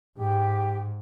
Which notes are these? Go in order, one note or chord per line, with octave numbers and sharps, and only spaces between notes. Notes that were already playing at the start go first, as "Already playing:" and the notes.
G#2 G4